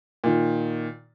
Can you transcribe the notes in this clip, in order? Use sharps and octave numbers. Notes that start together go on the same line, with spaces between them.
A#2 D#3